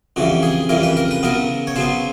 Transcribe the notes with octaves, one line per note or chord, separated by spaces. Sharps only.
F2 C#3 E3 G3 F#4
G#4
F2 C#3 E3 G3 A#4
B4
A#4
B4
C#3 F#3 B3 A#4
C#5
C#3 F#3 B3 C5